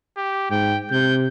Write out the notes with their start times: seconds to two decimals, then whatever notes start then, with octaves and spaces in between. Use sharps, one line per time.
0.17 G4
0.50 G#2 G5
0.91 C3 G6